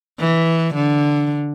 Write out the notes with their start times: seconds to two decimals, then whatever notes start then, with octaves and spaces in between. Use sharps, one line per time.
0.19 E3
0.75 D3